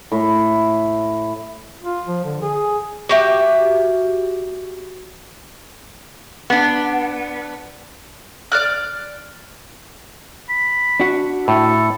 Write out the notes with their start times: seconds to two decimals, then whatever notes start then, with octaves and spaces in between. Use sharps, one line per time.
0.12 A2
1.84 F4
2.07 F3
2.25 D3
2.42 G#4
3.09 F#4 G4 E5
6.50 B3 D4
8.52 D5 F6 F#6
10.49 B5
11.00 D4 F#4
11.48 A2 A4